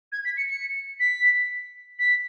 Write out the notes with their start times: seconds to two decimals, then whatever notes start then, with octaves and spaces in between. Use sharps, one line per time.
0.12 G#6
0.25 B6
0.37 C#7
0.50 C#7
1.00 B6
1.99 B6